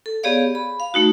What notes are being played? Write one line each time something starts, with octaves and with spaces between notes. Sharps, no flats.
A4
B3 G4 G#4 C#5 D5 F5
B5
F5
A3 D#4 F#4